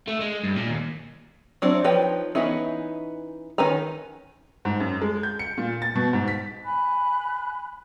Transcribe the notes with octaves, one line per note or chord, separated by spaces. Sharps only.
A3
G#3
G2
A#2
D#2
F#3 C4 D4 E4
F3 D#4 B4 C#5 G5
E3 B3 C#4 D#4 E4
D#3 C#4 B4 G#5 A#5
G#2
F#2
G#3
G6
C#7
A#2
A6
B2
G#2
B6
G#5 B5 F#6